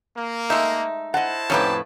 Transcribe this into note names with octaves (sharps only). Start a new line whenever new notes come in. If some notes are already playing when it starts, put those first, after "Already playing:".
A#3
G#3 A3 D#4 E5
E4 C5 D#5 F#5 A5
F2 A2 C#4 D#4 G4 B4